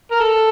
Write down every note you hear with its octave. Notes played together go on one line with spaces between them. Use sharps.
A#4
A4